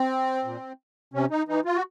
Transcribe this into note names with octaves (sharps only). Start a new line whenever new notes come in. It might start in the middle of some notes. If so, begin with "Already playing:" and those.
Already playing: C4
A#2
C3 C#4
D#4
E3 D#4
F4
F#4